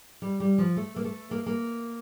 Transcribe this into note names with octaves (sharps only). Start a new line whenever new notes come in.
G3
G3
F3
A3
A#3
A3
A#3
A#3